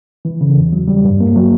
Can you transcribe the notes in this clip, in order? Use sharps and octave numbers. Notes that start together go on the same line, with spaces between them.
E3
C#3
E2
F#3
G3
G2
A#3
F#3